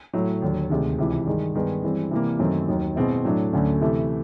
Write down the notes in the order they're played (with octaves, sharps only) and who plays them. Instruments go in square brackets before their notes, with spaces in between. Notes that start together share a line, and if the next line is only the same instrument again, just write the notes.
[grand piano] A2 F#3 A3
D#2 D3 F#3
D2 C3 D#3 G#3
C#2 C3 E3
G2 D#3 G#3
G2 D#3 G#3 B3 D#4
G2 E3 G#3 C4
C3 E3 G3 A#3
F#2 D#3 F#3 A3 C4
D#2 D#3 F#3
B2 G#3 C4 E4
A2 F#3 A3 D4
D2 D3 F#3 A3 C#4
C3 E3 A3